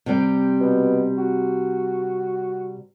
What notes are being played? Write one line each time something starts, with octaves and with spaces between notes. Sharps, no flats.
C3 G3 C4
B2
F#4